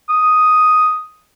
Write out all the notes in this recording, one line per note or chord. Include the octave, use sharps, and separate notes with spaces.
D#6